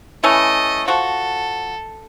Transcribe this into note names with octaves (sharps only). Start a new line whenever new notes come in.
E3 A3 C#4 D#5
F3 F#4 A4